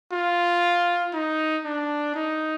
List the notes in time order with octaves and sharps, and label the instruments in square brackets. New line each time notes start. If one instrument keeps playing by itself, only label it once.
[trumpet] F4
D#4
D4
D#4